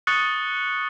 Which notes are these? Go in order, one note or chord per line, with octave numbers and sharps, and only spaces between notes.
C#6 D#6 F#6 A6 C#7 G7